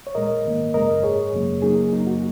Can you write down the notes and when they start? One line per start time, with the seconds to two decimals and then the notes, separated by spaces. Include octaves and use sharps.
0.07 C#5
0.15 A#2 G#3 A#4 D#5
0.45 G#2 D#3 A#3
0.74 F#2 C#3 G#3 A#4 D#5
1.03 G#2 G#3 G#4 C#5
1.33 F#2 C#3 F#3 A#3
1.62 C#3 F#3 A#3 D#4 G#4
1.92 F#2 C#3 F#3 A#3 D#4
2.07 F#4